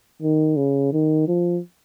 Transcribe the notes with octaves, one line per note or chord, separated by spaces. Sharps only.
D#3
C#3
D#3
F3